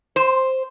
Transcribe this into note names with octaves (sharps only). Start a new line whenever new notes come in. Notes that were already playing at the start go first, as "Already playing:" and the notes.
C5